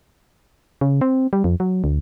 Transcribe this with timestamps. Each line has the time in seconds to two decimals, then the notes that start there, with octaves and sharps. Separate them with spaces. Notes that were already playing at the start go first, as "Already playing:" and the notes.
0.81 C#3
1.01 C4
1.33 G3
1.44 F2
1.60 F#3
1.84 D2